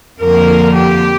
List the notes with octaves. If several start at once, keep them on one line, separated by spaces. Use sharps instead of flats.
F2 D3 F3 A#3 A#4
G4